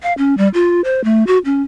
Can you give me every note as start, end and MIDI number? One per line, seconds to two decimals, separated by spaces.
0.03 0.13 77
0.18 0.35 61
0.38 0.48 55
0.54 0.81 65
0.84 1.03 72
1.04 1.26 57
1.27 1.38 66
1.45 1.62 61